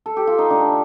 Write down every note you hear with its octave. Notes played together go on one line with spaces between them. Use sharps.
A4
G4
F4
D#4
D3 A3 D4